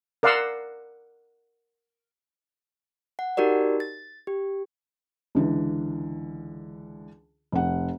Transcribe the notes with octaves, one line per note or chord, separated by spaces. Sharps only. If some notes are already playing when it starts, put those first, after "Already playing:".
A#4 D5 F5 F#5 C6 E6
F#5
D#4 F#4 G4 A#4 D5
A6
G4
C#2 D3 E3
F1 F#5